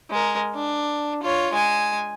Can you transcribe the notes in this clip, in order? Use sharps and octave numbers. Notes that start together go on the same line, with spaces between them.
G#3 A#4
D4
F4 C#5
G#3 G#5